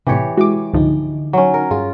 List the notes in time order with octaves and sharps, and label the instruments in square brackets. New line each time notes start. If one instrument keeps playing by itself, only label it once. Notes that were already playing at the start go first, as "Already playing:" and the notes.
[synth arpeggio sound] A2 C3 [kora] E3 G4 C#5
[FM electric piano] G#3 E4 [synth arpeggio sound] F#4 D6
[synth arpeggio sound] C#2 G#2 F3 [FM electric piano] D3 D#4
[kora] F#3 C#4
A#4
[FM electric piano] G2 G#4 [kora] F4